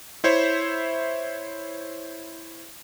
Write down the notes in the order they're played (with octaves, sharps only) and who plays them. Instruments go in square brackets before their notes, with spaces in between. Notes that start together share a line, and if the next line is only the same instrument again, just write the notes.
[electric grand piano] E4 C5 C#5 E5